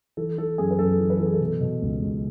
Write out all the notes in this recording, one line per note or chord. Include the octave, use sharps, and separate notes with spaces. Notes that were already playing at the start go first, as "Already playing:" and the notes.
E3 A4
E3 A4
F#2 G#4
B4
F#2 A4
E3
B4
E3 A4
G#4
A4
B2
B2
C#2
C#2